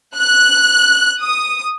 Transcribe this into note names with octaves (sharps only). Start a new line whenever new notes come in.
F#6
D#6